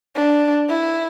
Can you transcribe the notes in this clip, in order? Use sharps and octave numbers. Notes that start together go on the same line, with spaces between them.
D4
E4